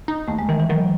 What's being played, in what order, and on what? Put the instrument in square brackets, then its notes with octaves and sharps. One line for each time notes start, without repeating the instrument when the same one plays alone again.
[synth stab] D#4
[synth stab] D#2 [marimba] A3
[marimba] G#3
[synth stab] D#3 [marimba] E3
[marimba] E3
[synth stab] D#3 [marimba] F#3